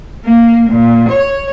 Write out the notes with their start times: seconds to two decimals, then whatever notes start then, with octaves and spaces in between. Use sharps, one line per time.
0.24 A#3
0.69 A#2
1.09 C#5